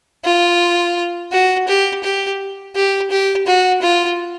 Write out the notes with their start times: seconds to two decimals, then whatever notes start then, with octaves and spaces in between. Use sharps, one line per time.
0.25 F4
1.32 F#4
1.68 G4
2.03 G4
2.76 G4
3.11 G4
3.47 F#4
3.82 F4